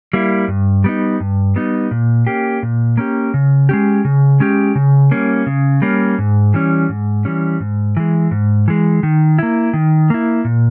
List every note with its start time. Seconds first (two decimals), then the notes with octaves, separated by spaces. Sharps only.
0.13 G3 A#3 E4
0.48 G2
0.84 G3 B3 D#4
1.20 G2
1.56 G3 B3 D#4
1.91 A#2
2.27 A#3 C#4 G4
2.63 A#2
2.97 A#3 C#4 G4
3.34 C#3
3.69 G#3 C#4 G4
4.05 C#3
4.40 G#3 C#4 G4
4.75 C#3
5.11 G3 A#3 C#4
5.46 C#3
5.82 G3 A#3 C#4
6.19 G#2
6.54 E3 G3 C#4
6.89 G#2
7.25 E3 G3 C#4
7.60 G#2
7.97 E3 G#3
8.31 G#2
8.68 E3 G#3
9.03 D#3
9.38 A#3 E4
9.73 D#3
10.10 A#3 E4
10.45 A#2